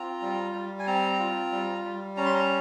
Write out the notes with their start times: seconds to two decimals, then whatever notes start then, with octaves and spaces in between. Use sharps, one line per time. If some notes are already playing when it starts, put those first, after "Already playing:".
Already playing: C4 F4 A#5
0.22 G3
0.54 G3
0.79 G#5
0.87 C4 A#5
1.20 F4
1.52 G3
1.85 G3
2.17 C#4 A#5
2.26 C6
2.35 A#5